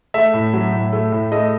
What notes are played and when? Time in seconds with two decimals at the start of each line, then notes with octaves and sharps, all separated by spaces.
0.14 A3 E5
0.33 A2
0.53 F#3
0.73 A2
0.93 A3
1.12 A2
1.32 A3 D#5